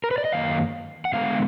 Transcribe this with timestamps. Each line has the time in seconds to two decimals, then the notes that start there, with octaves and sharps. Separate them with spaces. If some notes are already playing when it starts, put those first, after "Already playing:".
0.04 A#4
0.11 B4
0.18 D5
0.25 D#5
0.32 F#2 D#3 A#3 F5
1.05 F#5
1.13 D3 G#3 B3 F5